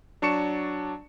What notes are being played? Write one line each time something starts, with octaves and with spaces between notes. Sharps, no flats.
F#3 D4 A5 C#6 C#7 E7